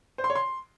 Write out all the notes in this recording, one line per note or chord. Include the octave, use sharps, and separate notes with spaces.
C5
C6
C#5
C6